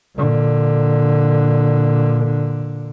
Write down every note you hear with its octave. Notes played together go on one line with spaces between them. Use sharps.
A#2 D3